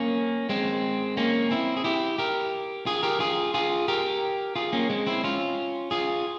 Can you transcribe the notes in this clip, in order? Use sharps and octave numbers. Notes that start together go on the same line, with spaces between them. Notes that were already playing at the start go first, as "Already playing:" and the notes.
Already playing: A#3 C#4
G#3 C4
A#3 C#4
C4 E4
G#4
E4 G4
G4 A#4
F4 G#4
G4 A#4
F4 G#4
F4 G#4
G4 A#4
F4 G#4
A#3 C#4
G#3 C4
C4 E4
C#4 F4
F4 G#4